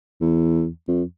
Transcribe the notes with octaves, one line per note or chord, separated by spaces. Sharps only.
E2
F2